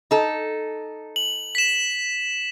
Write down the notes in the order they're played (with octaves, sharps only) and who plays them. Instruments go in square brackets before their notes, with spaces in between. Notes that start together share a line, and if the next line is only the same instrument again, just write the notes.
[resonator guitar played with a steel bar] D#4 A4
[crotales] F#7
B6 E7